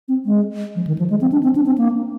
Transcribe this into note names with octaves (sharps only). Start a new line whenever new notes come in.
C4
G#3
F3
D#3
F3
G#3
C4
D4
C4
D4
C4
A#3